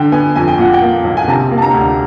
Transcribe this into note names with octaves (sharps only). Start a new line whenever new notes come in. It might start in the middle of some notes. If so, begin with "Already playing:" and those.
Already playing: D3 G5
B3 G#5
F2 G#5
G5
A#2 F#5
G5
A#3
B1
G#5
C3 A5
A#3
A5
A#5
D2